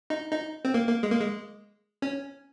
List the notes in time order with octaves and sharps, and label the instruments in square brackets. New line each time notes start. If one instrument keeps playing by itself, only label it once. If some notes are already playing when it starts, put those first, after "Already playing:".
[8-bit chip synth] D#4
D#4
C4
A#3
A#3
G#3
A#3
G#3
C#4